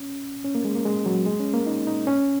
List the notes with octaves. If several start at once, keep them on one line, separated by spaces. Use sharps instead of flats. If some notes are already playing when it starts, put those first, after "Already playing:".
Already playing: C#4
C#4
A#3
G#3
A#3
G#3
F#3
G#3
C#4
A#3
D#4
D#4
C#4